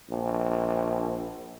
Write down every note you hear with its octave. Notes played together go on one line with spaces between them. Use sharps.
A#1